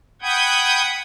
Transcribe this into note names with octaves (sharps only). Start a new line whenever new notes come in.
F#5 G5 B5 D#6 G6 G#6